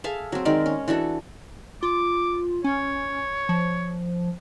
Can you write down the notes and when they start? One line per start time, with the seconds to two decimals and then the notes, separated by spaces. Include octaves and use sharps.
0.04 G#4 A4 E5 F5
0.32 F#3 C4
0.45 D#3 G#3 A#4 D5
0.66 C#4
0.88 E3 D4 F#4 A4
1.83 F4 D6
2.64 C#4 C#5
3.49 F3